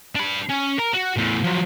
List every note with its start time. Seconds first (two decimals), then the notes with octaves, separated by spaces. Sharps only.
0.15 D4 B5
0.49 C#4
0.78 A#4 A#5
0.94 F#4
1.17 E2 A2
1.44 F3 F#3